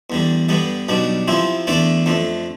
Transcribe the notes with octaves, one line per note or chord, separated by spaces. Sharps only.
E2 D3 G3
G2 D3 G3 B3
B1 B2 G3 D4
C3 F3 C4 E4
E2 D3 A3 D4 A4
F2 D3 A3